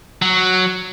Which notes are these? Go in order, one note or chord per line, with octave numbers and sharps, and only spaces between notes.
F#3